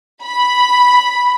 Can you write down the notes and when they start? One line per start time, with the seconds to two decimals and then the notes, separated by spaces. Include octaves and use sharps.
0.23 B5